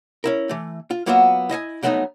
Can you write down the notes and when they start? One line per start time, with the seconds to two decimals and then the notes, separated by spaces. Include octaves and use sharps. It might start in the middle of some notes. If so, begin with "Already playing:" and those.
0.24 C#4 E4 A#4
0.49 E3 A3
0.91 F4
1.06 F#3 A#3 B3 F4 F#4 E5
1.50 E4 D#5 E5 G#5
1.83 F2 F#3 A3 B3 C4 D#4